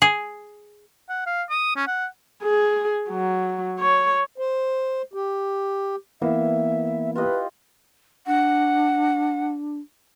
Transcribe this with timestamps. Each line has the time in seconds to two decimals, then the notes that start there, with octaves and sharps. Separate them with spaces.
0.02 G#4
1.09 F#5
1.26 F5
1.50 D#6
1.76 C#4
1.87 F#5
2.43 G#4
3.09 F#3
3.79 C#5
4.38 C5
5.14 G4
6.22 E3 A#3 B3 E4 E5
7.15 F4 G4 B4 D#5
8.27 D4 F#5